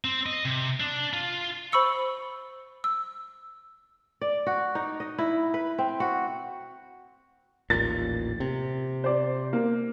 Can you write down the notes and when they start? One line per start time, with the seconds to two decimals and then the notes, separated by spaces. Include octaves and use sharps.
0.05 C4
0.26 D#5
0.45 C3
0.80 D4
1.13 F4
1.72 C5 B5 C#6 E6 C#7
2.84 E6
4.21 D5
4.47 F#4
4.75 D#4
5.00 D#5
5.18 E4
5.54 B4
5.78 C4
6.00 F#4
7.70 A1 D#2 A#2 A6
8.40 C3
9.04 C5 D5
9.53 A#3